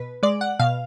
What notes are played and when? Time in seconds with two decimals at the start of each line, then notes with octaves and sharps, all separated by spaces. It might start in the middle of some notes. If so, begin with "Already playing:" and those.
Already playing: B2 B4
0.23 G#3 D5
0.41 F#5
0.59 B2 F5